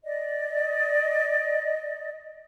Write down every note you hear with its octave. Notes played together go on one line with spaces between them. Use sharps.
D5 D#5